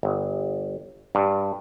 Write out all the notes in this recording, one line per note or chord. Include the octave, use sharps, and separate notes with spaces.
G1
G2